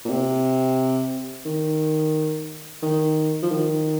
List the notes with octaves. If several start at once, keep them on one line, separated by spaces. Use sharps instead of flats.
A#2
C3
D#3
D#3
F3
D#3